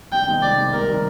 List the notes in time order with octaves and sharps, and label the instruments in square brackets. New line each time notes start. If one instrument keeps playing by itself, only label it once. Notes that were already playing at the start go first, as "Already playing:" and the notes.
[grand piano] C2 [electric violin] G5
[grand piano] C3 D#3 G#3
[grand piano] C2 [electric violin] D5
[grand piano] C3 D#3 G#3
[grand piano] C2 [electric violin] A#4
[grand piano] C3 D#3 G#3